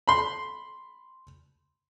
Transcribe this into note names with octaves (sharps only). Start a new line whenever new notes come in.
B5 C6